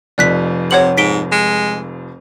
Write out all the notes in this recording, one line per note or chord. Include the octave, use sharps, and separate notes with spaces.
F1 F2 D5 F#6 B6
C3 C#5 F#5 F#7
G#2 B6 D7 G7
G#3